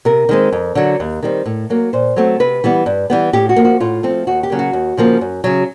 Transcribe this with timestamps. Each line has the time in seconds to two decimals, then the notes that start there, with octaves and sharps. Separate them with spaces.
0.05 C3 A#4
0.29 D#3 G#3 C4
0.52 F2
0.75 D3 F#3
1.00 D#2
1.23 D#3 G3 C4
1.46 A2
1.70 F#3 A#3
1.93 A#2 C5
2.16 F#3 A3 C4
2.40 C3 B4
2.64 E3 G3 B3
2.86 G2
3.10 E3 G3 B3
3.33 A2 G4
3.49 F#4
3.56 F3 A#3
3.65 F#4
3.80 A2 F4
4.03 F3 A3 C4
4.27 D#2 F#4
4.43 G4
4.50 C#3 F#3 A#3
4.59 F#4
4.73 D#2
4.97 C#3 F3 A#3
5.21 F#2
5.44 C#3 F#3